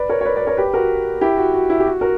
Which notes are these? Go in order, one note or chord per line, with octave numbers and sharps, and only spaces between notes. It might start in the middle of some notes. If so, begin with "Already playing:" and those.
Already playing: B4 D5
A#4 C#5
C#5
B4 D5
B4 D5
A#4 C#5
G4 B4
F#4 A#4
E4 G4
F#4
F#4
E4
G4
F#4
F#4 A#4